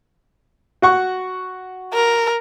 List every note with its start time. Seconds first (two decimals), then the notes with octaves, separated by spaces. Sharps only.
0.82 F#4 F#5 C#6
1.94 A#4